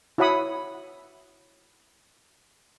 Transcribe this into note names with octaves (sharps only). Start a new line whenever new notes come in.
E4 F#4 C#5 F#5 B5 D#6